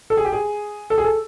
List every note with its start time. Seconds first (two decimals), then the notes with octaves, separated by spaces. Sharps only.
0.10 A4
0.17 G#4
0.25 G4
0.33 G#4
0.90 A4
0.98 G#4
1.04 A4